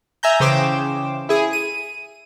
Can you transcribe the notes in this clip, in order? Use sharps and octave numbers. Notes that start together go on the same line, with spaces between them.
E5 G#5 A#5 G6
C#3 E3 C5 G5 D6 E7
E4 G#4 D#7
D#7